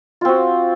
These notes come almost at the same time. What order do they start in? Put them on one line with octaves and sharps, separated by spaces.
F4 C4 F#4